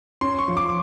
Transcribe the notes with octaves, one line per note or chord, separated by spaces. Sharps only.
C#4 C6
C#6
F3
D6